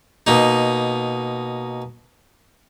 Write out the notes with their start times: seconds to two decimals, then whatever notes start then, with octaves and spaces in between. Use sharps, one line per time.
0.27 B2 A#3 D#4